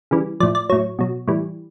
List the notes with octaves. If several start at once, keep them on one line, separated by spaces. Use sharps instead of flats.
C#3 E3 G3
A2 F3 D5
D5
A2 F#3 C#5
B2 F#3
A2 E3 G3